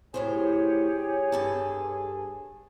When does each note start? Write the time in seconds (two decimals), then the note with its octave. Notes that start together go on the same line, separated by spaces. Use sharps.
0.14 D2 A2 G4 G#4 C5 C#5
1.32 G2 A4 A5